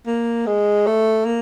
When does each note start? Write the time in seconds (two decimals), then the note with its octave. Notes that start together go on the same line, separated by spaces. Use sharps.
0.07 A#3
0.47 G#3
0.87 A3
1.26 A#3